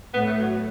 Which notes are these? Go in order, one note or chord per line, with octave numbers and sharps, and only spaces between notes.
A2 B3
A3
F#3